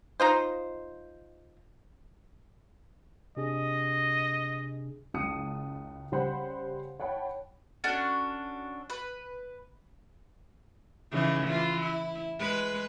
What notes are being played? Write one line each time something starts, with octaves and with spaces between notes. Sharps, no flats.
D#4 F4 C5
C3 D4 G#4 D#5
F#1 C#2 A5 D#6 C#7
C#3 G3 C5 F#5 B5
C#5 F#5 G5 A5 B5
C#4 D4 F#4 A4
B4
C#3 E3 D#4
E3 F4
E4
G#3 B4